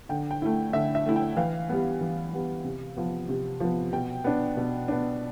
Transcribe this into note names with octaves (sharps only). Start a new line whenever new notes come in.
D3 G5
G5
A3 E4
D3 E5
E5
A3 E4
G5
E3 F5
G3 B3
E3
G3 B3
C3
F3 B3
C3
F3 B3
B2 G5
B3 D4
B2
B3 D4